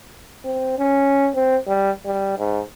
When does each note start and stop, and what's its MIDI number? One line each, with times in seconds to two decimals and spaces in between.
0.44 0.76 60
0.78 1.29 61
1.34 1.57 60
1.67 1.91 55
2.05 2.35 55
2.38 2.60 44